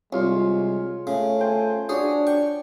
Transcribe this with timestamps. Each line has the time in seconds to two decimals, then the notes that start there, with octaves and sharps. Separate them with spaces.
0.13 C2 G#3 F4 C#5
1.07 C#3 A3
1.39 C5 G5 G#5
1.89 D4 F#4 G#4 C#5 D5
2.27 G5 C#6